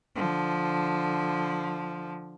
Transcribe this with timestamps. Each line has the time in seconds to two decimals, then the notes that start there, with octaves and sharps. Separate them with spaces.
0.15 D3 F3